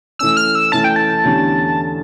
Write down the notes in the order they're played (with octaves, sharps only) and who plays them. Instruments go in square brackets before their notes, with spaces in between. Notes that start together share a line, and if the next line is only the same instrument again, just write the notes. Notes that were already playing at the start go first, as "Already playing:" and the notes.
[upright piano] E3 A3 C#4 [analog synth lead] E6
[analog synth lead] F6
E6
[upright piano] E3 A3 C#4 [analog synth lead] A5
[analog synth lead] G5
A5
[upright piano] E2 D3 A3 C#4 G4